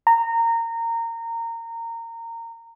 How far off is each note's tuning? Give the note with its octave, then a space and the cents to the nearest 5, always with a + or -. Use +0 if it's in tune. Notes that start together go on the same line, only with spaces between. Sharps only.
A#5 -20